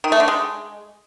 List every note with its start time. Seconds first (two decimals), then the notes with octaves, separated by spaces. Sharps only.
0.04 D#3
0.12 A3
0.20 D3
0.28 G#3